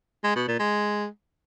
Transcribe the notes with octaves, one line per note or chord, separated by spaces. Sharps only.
G#3
B2
A#2
G#3